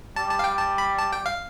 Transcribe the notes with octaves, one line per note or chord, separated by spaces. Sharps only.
G3 A5
A5
F5
G5
A5
B5
A5
G5
F5